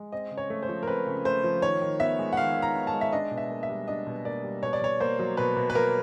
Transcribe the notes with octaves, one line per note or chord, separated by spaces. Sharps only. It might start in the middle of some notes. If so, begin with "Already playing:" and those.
Already playing: G#3
C4 D#5
C#3
C#5
A3
C5
F3
A#4
C4 B4
C#3
A3 C5
F3
D#3 C#5
D#3
B3 E5
G#3
F#5
D#3 F5
D#3
A#5
B3
A5
G#3
E5
D4 D#5
B2
E5
A#3
E5
G3
D4 D#5
B2
A#3 D5
G3
B2 C#5
D5
B2 C#5
A#3 C5
F#3
B2 B4
B2
B4
A#3 A#4